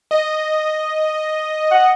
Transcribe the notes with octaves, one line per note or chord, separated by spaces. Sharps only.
D#5
F#5